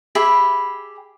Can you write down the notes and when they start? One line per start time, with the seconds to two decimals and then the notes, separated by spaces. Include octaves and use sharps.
0.15 G4 G#4 E5 B5